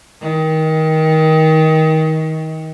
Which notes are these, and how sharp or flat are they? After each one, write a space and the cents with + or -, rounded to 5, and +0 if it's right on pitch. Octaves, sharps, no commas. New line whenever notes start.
D#3 +25